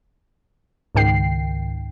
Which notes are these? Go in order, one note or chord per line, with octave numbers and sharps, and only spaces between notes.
C#2 G#2 D#3 G5 C7